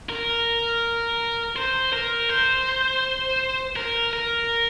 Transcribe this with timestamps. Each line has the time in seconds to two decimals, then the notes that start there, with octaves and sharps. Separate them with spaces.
0.09 A#4
1.56 C5
1.93 A#4
2.29 C5
3.76 A#4
4.13 A#4